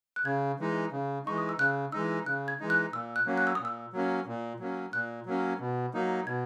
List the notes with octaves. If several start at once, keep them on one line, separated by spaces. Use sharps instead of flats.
F#6
C#3 G#6
E3 G#3 D#4
C#3
E3 G#3 D#4 C#6
D#6
E6
C#3 F#6
E3 G#3 D#4 E6
C#3 F#6
G#6
E3 G#3 D#4
F#6
A#2 E6
F#6
F#3 A#3 C#4
F#6
E6
D#6
A#2
E6
F#3 A#3 C#4
A#2
F#3 A#3 C#4
A#2 F#6
F#3 A#3 C#4
B2
F#3 A#3 D#4
B2 G#6